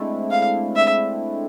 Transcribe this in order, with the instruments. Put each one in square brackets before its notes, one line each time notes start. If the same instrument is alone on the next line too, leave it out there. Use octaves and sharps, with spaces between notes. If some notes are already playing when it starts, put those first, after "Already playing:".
Already playing: [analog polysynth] G#3 A3 C4 D4 E4
[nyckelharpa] F5
E5